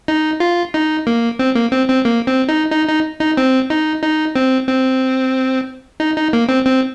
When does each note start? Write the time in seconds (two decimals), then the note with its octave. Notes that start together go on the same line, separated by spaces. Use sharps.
0.08 D#4
0.40 F4
0.74 D#4
1.07 A#3
1.39 C4
1.55 A#3
1.72 C4
1.89 C4
2.05 A#3
2.27 C4
2.49 D#4
2.72 D#4
2.88 D#4
3.20 D#4
3.37 C4
3.70 D#4
4.02 D#4
4.35 C4
4.68 C4
6.00 D#4
6.16 D#4
6.33 A#3
6.49 C4
6.66 C4